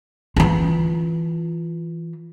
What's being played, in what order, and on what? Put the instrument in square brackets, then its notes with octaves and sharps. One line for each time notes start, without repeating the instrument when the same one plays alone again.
[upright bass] E3 F4